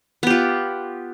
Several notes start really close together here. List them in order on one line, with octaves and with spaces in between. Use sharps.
B3 G4 F4